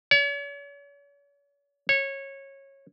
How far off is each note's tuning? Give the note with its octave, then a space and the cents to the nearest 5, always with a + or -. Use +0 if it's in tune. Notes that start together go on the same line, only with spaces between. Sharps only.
C#5 +40
C#5 -20